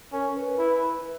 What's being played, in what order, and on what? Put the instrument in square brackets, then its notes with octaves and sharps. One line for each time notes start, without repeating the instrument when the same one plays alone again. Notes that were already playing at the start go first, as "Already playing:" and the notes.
[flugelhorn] C#4 [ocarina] A#4
[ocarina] B4
[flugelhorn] E4